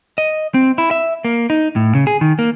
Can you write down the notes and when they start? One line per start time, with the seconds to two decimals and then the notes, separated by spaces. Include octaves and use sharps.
0.18 D#5
0.54 C4
0.78 E4
0.91 E5
1.25 A#3
1.50 D#4
1.76 A2
1.95 C#3
2.07 G#4
2.21 D#3
2.39 A#3